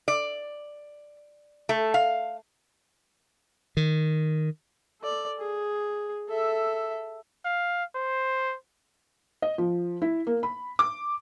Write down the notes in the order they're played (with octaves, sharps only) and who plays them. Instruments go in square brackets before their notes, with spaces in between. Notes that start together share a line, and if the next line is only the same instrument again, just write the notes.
[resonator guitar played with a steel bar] D5
A3
F5
[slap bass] D#3
[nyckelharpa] A4 D5
G#4
A4 E5
[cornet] F5
C5
[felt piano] D#5
F3
E4
A#3
B5
D6